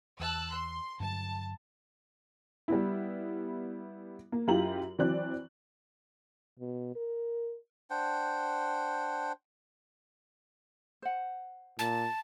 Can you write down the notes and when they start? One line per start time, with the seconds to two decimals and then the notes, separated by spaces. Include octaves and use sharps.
0.20 E2 A5 E6 F#6
0.51 C6
1.00 G2 D3 F#3 A5
2.68 G3 B3 E4
4.32 A#3
4.47 F#2 E4 F4 G4 A#5 F#7
4.99 E3 F#3 C4 D5 F#6
6.60 B2
6.96 A#4
7.90 D4 C5 F#5 G5
11.02 C5 F#5
11.79 A#2 A5